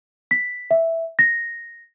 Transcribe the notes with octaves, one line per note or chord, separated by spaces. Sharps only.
B6
E5
A#6